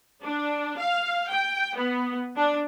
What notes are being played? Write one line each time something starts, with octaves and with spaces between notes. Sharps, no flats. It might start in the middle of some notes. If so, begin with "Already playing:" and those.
D4
F5
G5
B3
D4